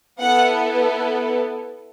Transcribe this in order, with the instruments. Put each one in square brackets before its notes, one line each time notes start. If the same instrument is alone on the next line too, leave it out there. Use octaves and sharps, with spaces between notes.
[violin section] B3 E4 A4 F#5